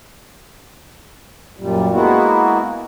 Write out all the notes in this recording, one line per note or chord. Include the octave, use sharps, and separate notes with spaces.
F#2 A#2 G3
G#3 A#3 B3 E4 F#4